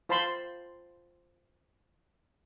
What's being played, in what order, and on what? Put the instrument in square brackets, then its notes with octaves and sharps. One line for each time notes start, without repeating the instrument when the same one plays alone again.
[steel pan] F4 C5 A5 B5 C6